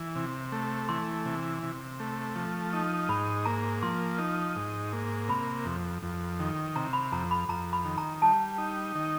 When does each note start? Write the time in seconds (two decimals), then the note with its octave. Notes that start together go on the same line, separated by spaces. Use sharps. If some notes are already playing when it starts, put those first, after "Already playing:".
Already playing: E3
0.16 C3
0.52 A3
0.89 E3 C6
1.25 C3
1.63 C3
2.00 A3
2.35 F3
2.73 D#4
3.09 G#2 B5
3.45 A#3 A#5
3.83 F3 C6
4.18 D#4
4.56 G#2
4.93 A#3
5.28 C3 B5
5.65 F2
6.03 F2
6.39 D#3
6.76 C3 A#5
6.93 B5
7.12 F2 A#5
7.31 B5
7.49 F2 A#5
7.73 B5
7.85 D#3
7.98 A#5
8.22 G3 A5
8.58 D#4
8.95 D#3